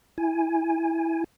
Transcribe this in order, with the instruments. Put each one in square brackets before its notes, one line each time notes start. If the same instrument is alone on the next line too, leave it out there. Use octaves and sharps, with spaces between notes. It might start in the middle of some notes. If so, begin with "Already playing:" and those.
[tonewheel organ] E4 G#5